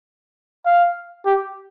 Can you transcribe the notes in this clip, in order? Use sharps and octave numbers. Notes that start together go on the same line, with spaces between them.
F5
G4